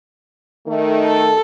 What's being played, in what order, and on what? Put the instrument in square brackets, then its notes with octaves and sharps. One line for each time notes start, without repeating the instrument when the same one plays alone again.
[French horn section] D#3 A3
[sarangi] A4